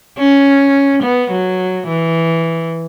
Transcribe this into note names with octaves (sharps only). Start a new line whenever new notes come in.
C#4
B3
F#3
E3